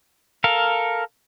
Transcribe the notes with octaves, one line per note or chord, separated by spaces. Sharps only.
A4 A#4 F5